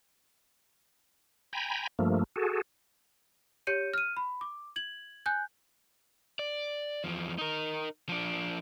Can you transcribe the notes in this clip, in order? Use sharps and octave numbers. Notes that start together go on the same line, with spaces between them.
G5 G#5 A#5 B5
G2 F3 A3 A#3
F#4 G#4 A4
G4 C#5 G6 C#7 D#7
F6 D#7
B5
D6
G#6 F#7
G#5 F#6 G6
D5
E2 F3
D#4 A#4
F3 D4